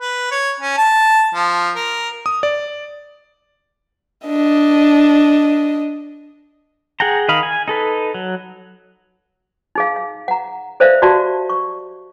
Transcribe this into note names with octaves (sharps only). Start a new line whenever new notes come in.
B4
C#5
C#4
A5
F3
A#4
D#6
D5
D4 D#5
G#4 F#5 G5 A#5
D#3 D#5 F5 B5
G#5
D#4 A4 B4
F#3
D#4 G#4 F5
F5
F#5 A#5
A4 C5 D5 E5 F5
F#4 G4 D5 F5 A5
C#6